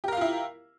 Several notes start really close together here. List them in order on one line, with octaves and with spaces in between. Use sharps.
G4 A#4 F5 F4 E4